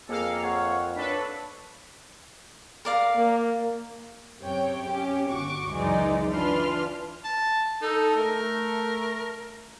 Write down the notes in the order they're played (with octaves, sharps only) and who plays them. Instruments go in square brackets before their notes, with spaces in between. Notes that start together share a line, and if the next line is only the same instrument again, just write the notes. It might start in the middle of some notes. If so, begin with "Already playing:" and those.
[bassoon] F2 [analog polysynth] A#3 F5 [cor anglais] G#4 [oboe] A4
[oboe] C#5 [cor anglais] F#5
[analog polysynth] D4 A4 B4 [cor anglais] C#5 [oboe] B5
[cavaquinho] A#4 D5 F5
[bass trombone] A#3
[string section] F#2 C3 C#5 G5
C#4 G4
G1 F#4 C#6 D6
C#2 F#2 E3 G#3 D#4 D5
E3 D4 F4 B4 C6 F6
[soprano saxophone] A5
[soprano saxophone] D#4 [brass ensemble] A4
[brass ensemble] A3 [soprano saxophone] A#4